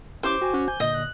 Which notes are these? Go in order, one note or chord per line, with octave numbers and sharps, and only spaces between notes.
C#4 E4 G4 C5 D6
F#4 G5 G#5
C#4 F#4
G#5 G6
A#2 D3 D#5
F#6